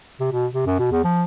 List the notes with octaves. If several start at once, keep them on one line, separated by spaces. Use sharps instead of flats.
C3
B2
C3
F#2
B2
E2
F3